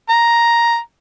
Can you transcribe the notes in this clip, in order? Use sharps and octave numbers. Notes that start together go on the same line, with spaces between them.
A#5